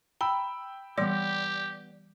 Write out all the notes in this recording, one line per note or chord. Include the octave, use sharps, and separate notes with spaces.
G5 A#5 B5 E6
E3 G3 B3 G4 D5 C6